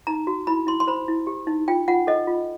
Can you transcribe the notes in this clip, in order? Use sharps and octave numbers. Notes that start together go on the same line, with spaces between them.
D#4 A#5
F#4
E4 B5
E4 C6
C6
C5 B5
E4
G4
D#4
F4 G5
F4 F#5
A4 D#5
F4